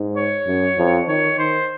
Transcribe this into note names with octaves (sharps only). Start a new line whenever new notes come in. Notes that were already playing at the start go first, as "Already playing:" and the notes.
Already playing: G#2
C#5
F#2
F2
D#3 C#5
D#3 C5